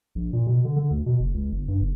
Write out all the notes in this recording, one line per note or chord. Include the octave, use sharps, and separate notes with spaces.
A#1
A#2
B2
D3
D3
D2
B2
F#1
C#2
G1
G2
F#1